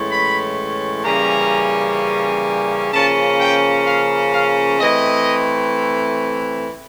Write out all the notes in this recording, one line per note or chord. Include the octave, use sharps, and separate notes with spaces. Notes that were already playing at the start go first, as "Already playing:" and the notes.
Already playing: A2 E3 G#3 C#4
B5
C#3 E3 G3 A#3 C#4 A#5
C#3 F3 A#3 C#4 A5
G5
F5
F5
E3 A3 C4 D#5